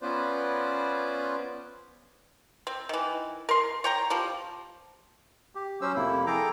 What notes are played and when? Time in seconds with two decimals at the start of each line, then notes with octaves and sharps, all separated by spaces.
0.02 B3 C#4 F4 B4 C5 D5
2.67 C4
2.89 D#3 E3
3.49 A#4 C6
3.84 C#5 G5 A#5
4.10 F3 G3
5.55 G4
5.82 F#3 C#4 C5 E6
5.96 F2 A2 C3 A#3 E4
6.27 G#4 A4 G5 A#5 D6